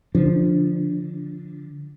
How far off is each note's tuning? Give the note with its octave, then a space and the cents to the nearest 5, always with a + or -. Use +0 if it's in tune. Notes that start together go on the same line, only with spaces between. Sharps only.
D3 -15 F3 -5 D4 +0